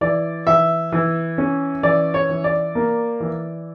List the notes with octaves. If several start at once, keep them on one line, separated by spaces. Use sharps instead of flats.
E3 D5
E3 E5
E3
C#4
E3 D5
C#5
E3
D5
A#3
E3